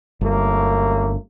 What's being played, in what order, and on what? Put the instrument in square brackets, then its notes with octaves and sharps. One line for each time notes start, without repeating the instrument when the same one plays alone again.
[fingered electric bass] G1 [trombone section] F#2 A3 A#3